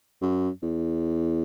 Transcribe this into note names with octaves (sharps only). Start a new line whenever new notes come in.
F#2
E2